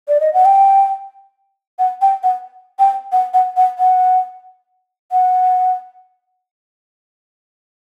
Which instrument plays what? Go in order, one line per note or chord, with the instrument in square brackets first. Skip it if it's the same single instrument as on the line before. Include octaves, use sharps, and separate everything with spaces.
[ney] D5
D#5
F#5
G5
F#5
G5
F#5
G5
F#5
F#5
F#5
F#5
F#5